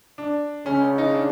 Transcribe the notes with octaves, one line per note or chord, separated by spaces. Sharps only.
D4
C#3 C#4
D#4
D4